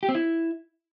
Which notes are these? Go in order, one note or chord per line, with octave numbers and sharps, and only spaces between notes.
G4
C4
E4